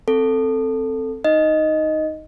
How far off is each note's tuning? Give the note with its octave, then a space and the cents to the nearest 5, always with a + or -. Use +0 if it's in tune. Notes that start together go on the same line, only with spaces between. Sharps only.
C4 +0 A4 +10
D#4 +0 D#5 +0